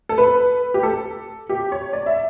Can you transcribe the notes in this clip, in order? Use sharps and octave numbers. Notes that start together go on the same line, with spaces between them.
A4
B4
G4
A4
G4
C#5
D5
E5